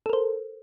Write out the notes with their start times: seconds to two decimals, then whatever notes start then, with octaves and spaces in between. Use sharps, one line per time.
0.06 A4
0.09 A#4
0.13 C5